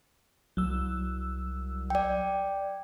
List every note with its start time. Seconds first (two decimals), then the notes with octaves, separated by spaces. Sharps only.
0.57 C2 F#3 E6
1.90 D5 G5